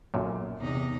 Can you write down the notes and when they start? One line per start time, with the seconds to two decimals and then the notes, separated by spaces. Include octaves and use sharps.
0.14 B1 F#2 A#2
0.58 E2 C3 D#4